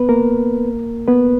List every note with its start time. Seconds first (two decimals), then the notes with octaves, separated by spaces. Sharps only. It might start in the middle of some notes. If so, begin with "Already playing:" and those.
Already playing: B3 B4
0.09 A#3 A#4
1.08 B3 B4